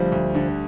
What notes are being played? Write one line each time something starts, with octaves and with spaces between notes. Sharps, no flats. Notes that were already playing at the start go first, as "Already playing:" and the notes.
Already playing: D2 F3 G3
D2
D3